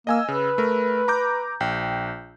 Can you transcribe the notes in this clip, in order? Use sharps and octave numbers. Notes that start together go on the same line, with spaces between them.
A#3 D#5 G#5 E6
C#3 B4
A3 A#4
A#5 D6 G6
A#1 G5